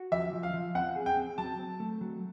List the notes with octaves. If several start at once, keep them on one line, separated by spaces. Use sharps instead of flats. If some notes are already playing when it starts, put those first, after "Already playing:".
Already playing: F#4
F3 E5
F3
F5
F3
C4 F#5
G#4
G5
C4
F#3 A5
C4
A3
F#3